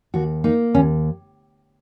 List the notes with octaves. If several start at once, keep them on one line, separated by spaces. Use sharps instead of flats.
D#2 F#4
A#3 D#4
D#2 C#4